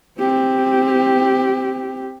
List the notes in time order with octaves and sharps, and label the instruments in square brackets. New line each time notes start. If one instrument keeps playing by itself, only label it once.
[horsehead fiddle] C4 G4